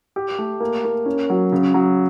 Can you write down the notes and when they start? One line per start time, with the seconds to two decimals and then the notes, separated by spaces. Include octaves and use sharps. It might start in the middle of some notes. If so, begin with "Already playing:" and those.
0.16 G4
0.39 A3
0.60 A#3
0.84 A#3
1.06 C#4
1.30 F#3
1.52 C#3
1.74 F#3